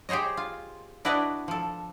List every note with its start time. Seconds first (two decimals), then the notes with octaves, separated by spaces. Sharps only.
0.09 G4 G#4 C5 C#5 D#5
0.37 F4
1.05 D4 E4 F#4 B4 D5 D#5
1.48 F3 A4